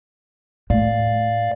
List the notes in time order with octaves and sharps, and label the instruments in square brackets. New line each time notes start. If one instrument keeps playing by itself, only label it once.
[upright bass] A2 [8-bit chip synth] D5 F5